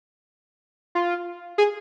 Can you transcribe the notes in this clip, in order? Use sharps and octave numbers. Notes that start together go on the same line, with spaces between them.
F4
G#4